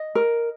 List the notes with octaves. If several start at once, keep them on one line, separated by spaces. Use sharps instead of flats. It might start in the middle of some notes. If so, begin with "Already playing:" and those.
Already playing: D#5
A#4